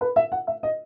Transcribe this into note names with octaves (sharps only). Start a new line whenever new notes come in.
B4
E5
F#5
E5
D#5